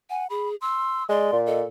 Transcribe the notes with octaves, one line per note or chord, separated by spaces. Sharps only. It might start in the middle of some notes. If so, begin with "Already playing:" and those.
F#5 G#5
G#4 B5
C6 E6
G#3 D5 C6
A#2
A4 D#5